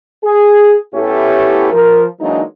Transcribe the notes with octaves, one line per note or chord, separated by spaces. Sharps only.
G#4
A2 A3 B3 C#4 E4 G4
F3 A#4
E3 F#3 G#3 A#3 D4 D#4